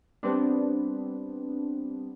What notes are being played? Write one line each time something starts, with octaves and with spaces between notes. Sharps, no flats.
G3 B3 C4 D4